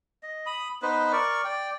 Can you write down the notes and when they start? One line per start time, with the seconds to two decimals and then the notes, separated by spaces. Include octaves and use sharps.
0.23 D#5
0.46 B5 D#6
0.82 B3 D#4 B4 C5
1.12 A#4 D5 C#6
1.45 D5 G5